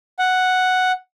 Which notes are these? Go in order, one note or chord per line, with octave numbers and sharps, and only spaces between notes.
F#5